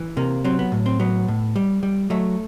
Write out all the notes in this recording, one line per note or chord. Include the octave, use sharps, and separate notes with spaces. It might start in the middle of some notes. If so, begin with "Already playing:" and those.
Already playing: E3
C3 A#3
F#3 C4
B3
A2
C4
F#3 B3
A2
G3
G3
F#3 A3